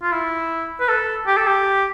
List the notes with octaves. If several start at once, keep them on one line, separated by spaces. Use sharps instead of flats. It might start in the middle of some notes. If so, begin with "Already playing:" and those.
F4
E4
B4
A4
G4
A4
G4